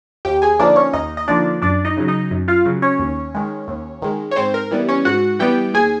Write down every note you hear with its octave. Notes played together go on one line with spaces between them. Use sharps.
D#2 G4 G5
G#4 G#5
D3 F3 A#3 D4 D#4 D5
C#4 C#5
D#2 D#4 D#5
D#5
D3 F3 A#3 D4 D#4 D5
F#2 D4 D5
D#4 D#5
C#3 F#3
D#4 D#5
F#2
F4 F5
C#3 F#3
C#4 C#5
D#2
D#3 G#3
D#2
D#3 G#3
C#5
G#2 C4 C5
A#4
E3 G3 B3
C#4 C#5
G#2 F#4 F#5
E3 G3 B3 G4 G5
D#2 G#4 G#5